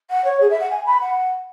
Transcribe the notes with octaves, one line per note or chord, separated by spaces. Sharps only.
F#5
C#5
G#4
E5
F#5
G#5
B5
F#5